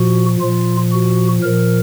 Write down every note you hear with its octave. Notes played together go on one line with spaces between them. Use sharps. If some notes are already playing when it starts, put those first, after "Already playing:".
Already playing: A#2 F3 F#4
A#2 F3 F4
F#4
A#2 F3 A#4